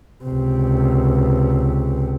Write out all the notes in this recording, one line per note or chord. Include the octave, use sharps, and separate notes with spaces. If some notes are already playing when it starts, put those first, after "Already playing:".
C#2 C3